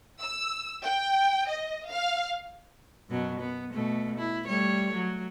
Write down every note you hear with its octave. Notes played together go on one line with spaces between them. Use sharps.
E6
G5
D#5
F5
F#2 B2 F#3
B3
B2 A3
E4
G3 A3 C#5
F#3